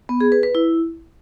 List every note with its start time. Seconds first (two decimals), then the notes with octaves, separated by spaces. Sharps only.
0.09 B3
0.21 G#4
0.32 B4
0.43 B4
0.55 E4